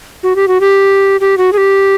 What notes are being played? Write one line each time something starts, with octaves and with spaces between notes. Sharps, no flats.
F#4
G4
F#4
G4
G4
F#4
G#4
G4